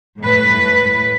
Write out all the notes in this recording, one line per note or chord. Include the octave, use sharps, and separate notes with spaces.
A2 B4